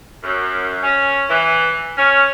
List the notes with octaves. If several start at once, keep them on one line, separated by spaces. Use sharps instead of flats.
F#2
C#4
E3
C#4